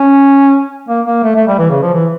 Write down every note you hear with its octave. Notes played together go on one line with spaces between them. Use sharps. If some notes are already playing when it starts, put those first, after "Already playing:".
Already playing: C#4
A#3
A#3
A3
A3
G3
E3
C#3
F3
E3